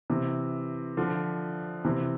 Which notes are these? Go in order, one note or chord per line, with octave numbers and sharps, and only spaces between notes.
C3 E3
D3 F3
C3 E3